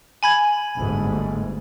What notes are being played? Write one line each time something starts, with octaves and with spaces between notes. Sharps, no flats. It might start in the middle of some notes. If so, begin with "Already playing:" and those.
G#5 B5 G#6
G1 D2 G#2